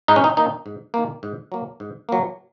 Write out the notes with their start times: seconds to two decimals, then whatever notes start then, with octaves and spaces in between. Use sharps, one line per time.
0.08 G#2 D#4
0.16 C#4
0.24 D#4
0.37 D#3 A#3 D#4
0.66 G#2
0.94 D#3 A#3
1.23 G#2
1.52 F#3 A#3
1.80 G#2
2.09 F#3 A#3